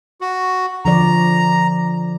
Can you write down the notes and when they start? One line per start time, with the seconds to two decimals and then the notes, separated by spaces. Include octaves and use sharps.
0.21 F#4
0.85 D3 F3 D5 A#5